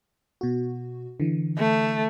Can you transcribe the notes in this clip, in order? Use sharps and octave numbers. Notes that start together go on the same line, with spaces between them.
B2 F#4
D3 E3
A3